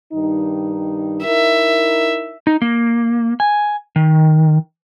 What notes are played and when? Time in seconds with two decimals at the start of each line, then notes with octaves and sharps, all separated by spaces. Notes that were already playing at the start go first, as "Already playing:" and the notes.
0.12 G2 D#3 D#4
1.25 D#4 E4 A#4 E5
2.47 D#4
2.62 A#3
3.40 G#5
3.96 D#3